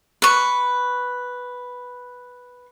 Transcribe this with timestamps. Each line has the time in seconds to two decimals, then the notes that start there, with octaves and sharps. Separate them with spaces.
0.22 B4 C#6